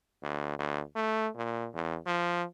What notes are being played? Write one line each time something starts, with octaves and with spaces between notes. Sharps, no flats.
D2
D2
A3
A#2
E2
F3